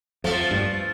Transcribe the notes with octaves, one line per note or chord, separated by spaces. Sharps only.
F2 F3 A3
G2